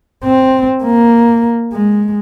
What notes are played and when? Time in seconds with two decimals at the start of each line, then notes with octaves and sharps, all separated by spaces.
0.24 C4
0.84 A#3
1.73 G#3